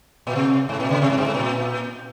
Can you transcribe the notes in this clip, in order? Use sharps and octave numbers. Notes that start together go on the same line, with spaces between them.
A#2
C3
G#2
A#2
C#3
C3
G#2
G2
G#2
A#2